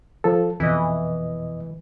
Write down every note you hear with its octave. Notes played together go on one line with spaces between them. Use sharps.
F3 A4
F2 B2 E3 D#5